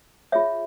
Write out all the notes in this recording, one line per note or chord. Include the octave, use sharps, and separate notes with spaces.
F4 G#4 C#5 E5